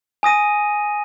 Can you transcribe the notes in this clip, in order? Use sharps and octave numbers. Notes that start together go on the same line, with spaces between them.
G#5 D#6 A#6 D#7